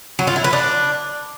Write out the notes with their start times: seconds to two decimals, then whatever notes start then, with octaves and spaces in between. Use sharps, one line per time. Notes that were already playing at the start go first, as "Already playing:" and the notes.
0.19 F#3
0.27 F4
0.36 E4
0.44 B4
0.53 D4